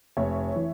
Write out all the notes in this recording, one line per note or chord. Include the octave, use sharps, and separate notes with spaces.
F1 C#5 E5
E3